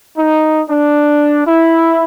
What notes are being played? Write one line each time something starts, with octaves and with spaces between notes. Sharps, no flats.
D#4
D4
E4